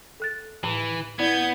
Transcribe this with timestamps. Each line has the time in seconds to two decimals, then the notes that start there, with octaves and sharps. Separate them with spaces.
0.20 A4 F#6 A6
0.64 A2 E3
1.19 B3 E4 D5 G6 G#6